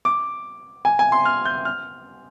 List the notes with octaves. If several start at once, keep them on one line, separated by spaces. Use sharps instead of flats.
D6
G#5
G#5
C6
F6
G6
F6